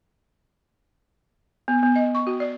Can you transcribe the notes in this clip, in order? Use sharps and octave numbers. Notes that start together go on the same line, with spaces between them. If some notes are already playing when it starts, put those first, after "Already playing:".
B3
B3
D#5
C#6
F#4
D5